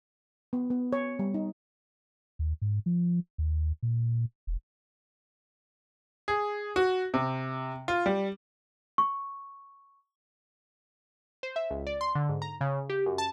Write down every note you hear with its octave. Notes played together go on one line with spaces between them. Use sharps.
B3
B3
C#5
G3
D#4
D#2
G#2
F3
D#2
A#2
E1
G#4
F#4
C3
F4
G3
C#6
C5
E5
C#2
D5
C6
D3
G#2
A#5
C#3
G4
F#2
A5